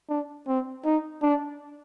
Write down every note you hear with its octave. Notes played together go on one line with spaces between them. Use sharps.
D4
C4
D#4
D4